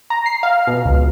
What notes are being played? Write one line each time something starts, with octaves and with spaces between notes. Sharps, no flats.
A#5
C7
F5
B2
C#2